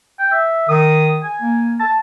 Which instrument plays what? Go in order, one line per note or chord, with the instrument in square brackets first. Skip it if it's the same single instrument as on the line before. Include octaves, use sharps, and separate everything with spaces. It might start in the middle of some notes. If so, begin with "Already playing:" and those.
[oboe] G5
E5
[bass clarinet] D#3 [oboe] D#6
[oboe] G#5
[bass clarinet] A#3
[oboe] A5